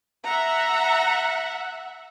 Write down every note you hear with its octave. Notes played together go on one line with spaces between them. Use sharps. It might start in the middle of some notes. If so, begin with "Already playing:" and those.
E5 F#5 A#5